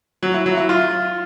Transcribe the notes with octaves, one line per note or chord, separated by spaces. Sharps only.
F#3
E4
F#3
E4
F4